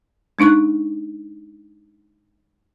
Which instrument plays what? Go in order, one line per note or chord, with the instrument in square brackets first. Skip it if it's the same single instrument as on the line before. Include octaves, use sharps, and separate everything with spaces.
[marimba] G#3 D4 D#4 C#6 F#6